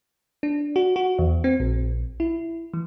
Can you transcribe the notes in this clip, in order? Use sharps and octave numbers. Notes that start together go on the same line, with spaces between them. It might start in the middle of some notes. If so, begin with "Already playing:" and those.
D4
F#4
F#4
E2
C4
A#1
E4
E3